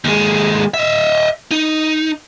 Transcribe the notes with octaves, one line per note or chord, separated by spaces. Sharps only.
D#2 G#3
D#5 E5
D#4